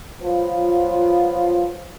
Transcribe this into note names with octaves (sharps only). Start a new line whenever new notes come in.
F3 F#3 B3 F4